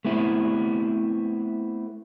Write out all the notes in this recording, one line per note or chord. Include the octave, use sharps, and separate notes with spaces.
A3 B3 C4 E4